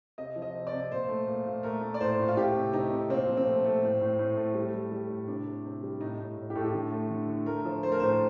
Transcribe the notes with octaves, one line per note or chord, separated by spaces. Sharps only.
C3 D#5
F3
D#5
C3
D5
C3
A#2 C5
A3
A#2
A#2
A3 A#4
A3
D5
A2 C5
A2
F4
A3 G4
C3
C3 D#4
C3
A#2 C4
F3
C4
A3
A3
A2
A2
A2
A3
G3
G3
G3
A2
C3 D4
C3
C3
G3
A2 D#4
A2
A2
G4
A2 A4
G4
D3 A4
A3
D3
D3
A3 A#4
F3
A3 C5
A#4
A2 C5